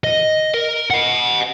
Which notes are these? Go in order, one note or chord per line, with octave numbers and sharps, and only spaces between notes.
D#5
A#4
D#5 F#5